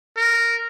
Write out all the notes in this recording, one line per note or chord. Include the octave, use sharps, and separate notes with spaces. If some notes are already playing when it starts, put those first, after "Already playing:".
A#4